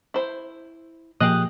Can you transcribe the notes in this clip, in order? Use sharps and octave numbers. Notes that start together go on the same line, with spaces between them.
E4 C5
A#2 F3 A#3 G4 G#4 D#5 D#6 F#6